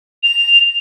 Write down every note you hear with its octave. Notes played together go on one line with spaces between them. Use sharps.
F7